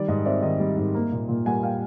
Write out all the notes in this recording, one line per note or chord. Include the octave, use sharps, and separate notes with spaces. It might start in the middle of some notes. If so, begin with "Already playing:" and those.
Already playing: D#3 G3 D5
G#2 D#5
C4 D5 E5
D#3 D#5
G3
G#2
A#3
A#2
A#2
G3 F#5 G#5
A#3 F5 G5